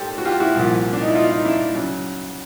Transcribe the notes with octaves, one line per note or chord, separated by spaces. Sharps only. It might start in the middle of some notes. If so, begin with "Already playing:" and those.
Already playing: G#2 D#3 G4 A4 C5 D5
F#4
F4 G4
E4 F#4
C2 A#2 F3
D4
D#4
E4
D#4 F4
D#4
D4 E4
C#3 F#3